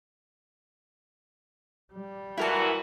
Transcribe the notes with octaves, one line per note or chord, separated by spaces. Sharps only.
G3
A#2 E3 E4 F#4 A#4 A5